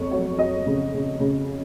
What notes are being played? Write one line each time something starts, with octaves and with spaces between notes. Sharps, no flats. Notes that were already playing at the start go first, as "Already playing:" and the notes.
Already playing: F2 C#5
F#3 C#5
F#3 D#5
C#3
C#3
C#3